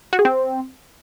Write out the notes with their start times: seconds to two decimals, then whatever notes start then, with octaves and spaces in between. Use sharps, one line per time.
0.13 F#4
0.19 G#4
0.25 C4